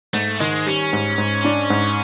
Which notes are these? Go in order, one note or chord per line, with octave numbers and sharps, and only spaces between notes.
G#2 A3
D#3 G#3
G3 C#4
G#2
G#2
D4
G#2